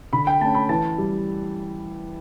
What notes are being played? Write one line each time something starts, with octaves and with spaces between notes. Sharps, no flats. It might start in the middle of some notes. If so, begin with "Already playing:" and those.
D3 B5
G5
A3 C#4 A5
B5
E3 A5
G3